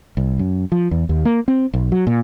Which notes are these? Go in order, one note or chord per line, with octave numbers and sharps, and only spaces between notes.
C2
F#2
F3
E2
D#2
A#3
C4
B1
F#3
A#2